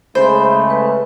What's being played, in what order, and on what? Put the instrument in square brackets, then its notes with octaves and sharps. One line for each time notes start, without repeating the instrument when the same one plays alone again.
[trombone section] C#3 G#3 A3 [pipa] C5 [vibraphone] B5
[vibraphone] B4